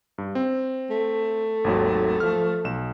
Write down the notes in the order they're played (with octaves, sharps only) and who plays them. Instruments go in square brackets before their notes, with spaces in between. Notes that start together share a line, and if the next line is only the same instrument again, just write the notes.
[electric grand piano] G2
C4
[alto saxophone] A3
[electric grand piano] G#1 D#2 F#3
F3 F6
B1 E7